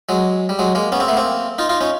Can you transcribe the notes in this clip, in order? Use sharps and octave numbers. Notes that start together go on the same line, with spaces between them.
F#3 G#3
G3
F#3 G#3
G#3 A#3
B3 C#4
A#3 C4
A3 B3
A#3 C4
D#4 F4
D#4 F4
C#4 D#4